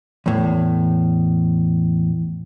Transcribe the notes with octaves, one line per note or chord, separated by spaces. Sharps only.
E2 A2